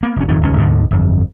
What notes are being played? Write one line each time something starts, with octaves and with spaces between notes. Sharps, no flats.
A#3 B3
F1 C#4
D#1 F2 G#2 D#3
D#1 C#2 C#4
D2 G#2 B2 D3
G1 F2